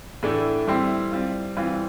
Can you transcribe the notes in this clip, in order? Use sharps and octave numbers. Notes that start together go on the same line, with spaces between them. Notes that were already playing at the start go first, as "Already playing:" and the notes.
A2 E3 A3 D4
G3 C4 E4
G3 C4 F4
E3 G3 C4 F4